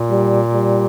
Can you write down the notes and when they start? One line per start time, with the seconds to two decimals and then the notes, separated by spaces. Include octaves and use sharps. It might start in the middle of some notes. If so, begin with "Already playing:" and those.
Already playing: A#2
0.10 G3
0.54 G3